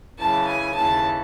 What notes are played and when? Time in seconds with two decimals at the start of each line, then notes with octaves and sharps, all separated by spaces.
0.18 F#2 C#3 E3 A5
0.47 G#5
0.75 D#2 C#3 E3 A5